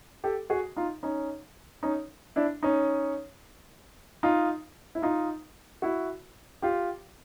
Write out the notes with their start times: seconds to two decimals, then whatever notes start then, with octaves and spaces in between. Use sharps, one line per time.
0.24 G4 A4
0.50 F#4 G#4
0.76 D#4 F4
1.03 C#4 D#4
1.83 C#4 D#4
2.36 D4 E4
2.63 C#4 D#4
4.23 D#4 F4
4.95 E4
5.02 D#4 F4
5.82 E4 F#4
6.62 F4 G4